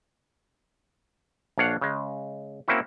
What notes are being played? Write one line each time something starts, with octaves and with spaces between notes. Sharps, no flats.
A#1 D4 C#5 F5 F#5
C#3 G#3
A#3 C4 C#4 E4 F#4